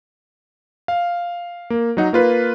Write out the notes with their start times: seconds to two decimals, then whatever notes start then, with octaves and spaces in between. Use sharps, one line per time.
0.88 F5
1.70 A#3
1.97 F#3 D#4 F#5
2.13 A#3 F4 B4